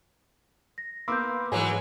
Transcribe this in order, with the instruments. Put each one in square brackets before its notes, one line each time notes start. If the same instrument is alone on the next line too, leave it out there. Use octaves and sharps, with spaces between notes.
[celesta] A#6
[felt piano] A#3 B3 [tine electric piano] B5 C6 D6 [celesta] E6 G6
[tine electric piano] G#2 [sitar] E3 F#3 G#3 [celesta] G#5